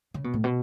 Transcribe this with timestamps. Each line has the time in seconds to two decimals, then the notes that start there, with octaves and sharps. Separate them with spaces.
0.14 C#3
0.24 B2
0.34 A2
0.44 B2